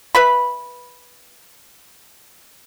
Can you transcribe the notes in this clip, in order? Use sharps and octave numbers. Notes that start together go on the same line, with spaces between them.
B4 E5 B5